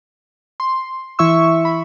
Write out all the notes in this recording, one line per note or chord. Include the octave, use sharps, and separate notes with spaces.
C6
E3 E4 E5 C#6 E6
B5